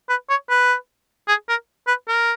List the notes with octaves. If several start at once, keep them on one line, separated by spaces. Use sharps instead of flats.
B4
C#5
B4
G#4
A#4
B4
A#4